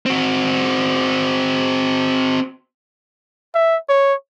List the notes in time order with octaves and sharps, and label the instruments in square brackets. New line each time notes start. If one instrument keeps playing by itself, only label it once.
[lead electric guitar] C4 F#4
[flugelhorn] E5
C#5